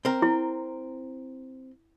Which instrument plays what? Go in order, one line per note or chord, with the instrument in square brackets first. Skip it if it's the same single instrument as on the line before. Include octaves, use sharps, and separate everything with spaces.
[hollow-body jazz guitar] C4 A#4
[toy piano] E4